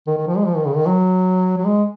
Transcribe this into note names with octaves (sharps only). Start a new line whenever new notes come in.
D#3
D#3
F3
G#3
F3
D#3
C#3
D#3
F#3
F#3
G#3